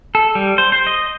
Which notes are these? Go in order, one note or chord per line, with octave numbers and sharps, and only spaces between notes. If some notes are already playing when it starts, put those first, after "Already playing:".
A4
G3
C5
C5
D#5